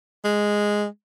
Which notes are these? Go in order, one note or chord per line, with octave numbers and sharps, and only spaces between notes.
G#3